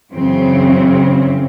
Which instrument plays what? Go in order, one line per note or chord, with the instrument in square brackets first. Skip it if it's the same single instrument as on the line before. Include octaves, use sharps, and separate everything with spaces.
[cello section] F#2 C#3 E3 C4